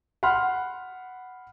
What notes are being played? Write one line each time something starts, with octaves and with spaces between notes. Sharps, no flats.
F#5 B5 C6 F6